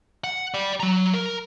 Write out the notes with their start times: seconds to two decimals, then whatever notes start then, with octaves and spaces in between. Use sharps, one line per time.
0.24 F#5
0.54 D5 G5
0.80 F#3 A#5
1.14 A#4